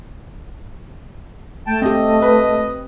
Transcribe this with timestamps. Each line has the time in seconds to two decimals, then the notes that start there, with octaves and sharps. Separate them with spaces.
1.67 A3 G5 A5
1.82 C4 G4 D#5
2.22 B4